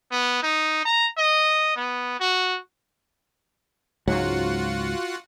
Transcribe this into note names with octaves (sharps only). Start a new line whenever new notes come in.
B3
D#4
A#5
D#5
B3
F#4
C#2 G#2 F#3 F4 F#4 F#5